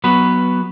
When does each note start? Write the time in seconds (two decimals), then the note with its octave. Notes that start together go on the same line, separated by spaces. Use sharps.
0.04 F#3 B3 F#4 B4